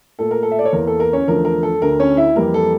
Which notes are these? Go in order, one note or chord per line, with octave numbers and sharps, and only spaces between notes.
A#2 A3 A4
A#4
A4
E5
D5
C#5
E2 E3 A#3 A#4
A4
A#4
C#4 C#5
E2 D3 F3 A3 A#4
A#4
A4
D2 D3 A3 A#4
C#4 C#5
E4 E5
F2 E3 G3 A#3 A#4
A4